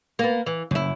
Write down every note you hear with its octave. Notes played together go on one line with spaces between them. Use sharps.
A#3 B3
E3
F#1 F#2 E4